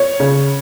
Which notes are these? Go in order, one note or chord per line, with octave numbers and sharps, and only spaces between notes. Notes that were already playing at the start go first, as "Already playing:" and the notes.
Already playing: C#5
C#3